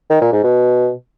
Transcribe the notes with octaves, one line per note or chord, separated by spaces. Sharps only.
D#3
A#2
G#2
B2